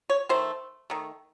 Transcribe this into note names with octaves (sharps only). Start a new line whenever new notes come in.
C#5
D#3 A3 C5
D#3 A3